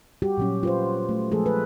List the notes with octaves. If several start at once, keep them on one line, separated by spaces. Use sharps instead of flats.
G3 F#4 G4
A#2 F#3 C#4
F4 B4 C5
A3
F3 G#3 A3 G#4 A4
B4